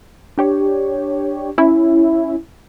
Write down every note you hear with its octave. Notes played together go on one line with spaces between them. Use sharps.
D4 G4 C#5
C#4 E4